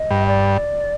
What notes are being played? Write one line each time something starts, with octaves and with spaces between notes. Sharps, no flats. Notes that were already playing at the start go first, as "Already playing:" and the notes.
Already playing: D#5
G2
D5